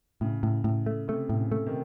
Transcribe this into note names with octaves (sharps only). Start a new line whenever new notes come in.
A2 C#3
A2
A2
A3
C3 A3
A2
C#3
A3
C3 D#3